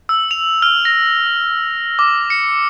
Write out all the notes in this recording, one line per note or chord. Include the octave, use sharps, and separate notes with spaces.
E6
F7
F6
A#6
D6
C#7